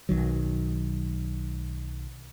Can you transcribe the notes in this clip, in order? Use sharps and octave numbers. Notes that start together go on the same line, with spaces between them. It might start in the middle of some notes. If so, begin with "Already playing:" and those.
B1 D#3 F#3